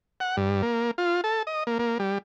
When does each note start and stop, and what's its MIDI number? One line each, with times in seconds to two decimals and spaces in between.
0.20 0.36 78
0.37 0.62 43
0.62 0.91 58
0.98 1.21 65
1.24 1.43 69
1.47 1.63 75
1.67 1.78 58
1.79 1.98 58
1.99 2.18 55